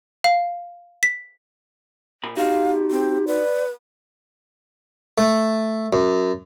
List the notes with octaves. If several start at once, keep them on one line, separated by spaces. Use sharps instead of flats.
F5
B6
A#2 B5
D#4 F#4 G4 F5
C4
B4 D5
A3
F#2